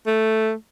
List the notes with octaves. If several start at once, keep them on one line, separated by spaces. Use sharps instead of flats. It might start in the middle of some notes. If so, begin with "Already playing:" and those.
A3